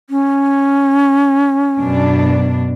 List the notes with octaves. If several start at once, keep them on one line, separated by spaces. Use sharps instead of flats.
C#4
F#2 B2 D4